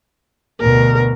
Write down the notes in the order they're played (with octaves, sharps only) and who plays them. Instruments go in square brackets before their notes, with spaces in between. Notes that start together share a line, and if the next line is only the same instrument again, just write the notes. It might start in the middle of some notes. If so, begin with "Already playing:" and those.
[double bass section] D2 B2 [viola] A#4